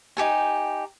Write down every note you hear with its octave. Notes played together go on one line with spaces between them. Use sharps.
D#4 G4 A4 G#5